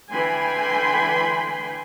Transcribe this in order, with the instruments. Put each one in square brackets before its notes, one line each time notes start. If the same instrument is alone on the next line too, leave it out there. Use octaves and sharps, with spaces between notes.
[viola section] D3 E3 G5 G#5 B5 C6